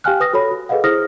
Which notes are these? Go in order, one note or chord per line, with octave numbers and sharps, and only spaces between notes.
G4 F5 G5 G#5 F6 F#6
B4 D#6 A#6
F#4 A4 C#5 B5
F#4
G#4 A4 B4 D#5 F5 F#5
E4 G#4 C5 D#6 F6 A#6